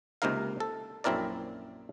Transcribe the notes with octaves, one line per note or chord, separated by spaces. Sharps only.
C#2 C3 A#3 D#4 A#4 F5
A4
A#1 F#2 C4 E4 A#4 D5